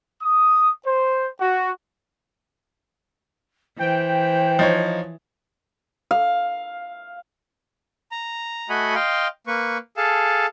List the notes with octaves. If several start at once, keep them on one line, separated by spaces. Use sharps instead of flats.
D#6
C5
F#4
E3 C5 G5
F3 D#4 C#5
F5
A#5
A3 F#4 D#5 F#5 G#5 B5
D#5 F5 G5 C6
A#3 B4 C#6
G#4 A4 F5 A5